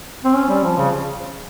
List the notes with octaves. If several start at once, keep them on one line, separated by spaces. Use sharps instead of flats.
C4
C#4
G3
F3
C#3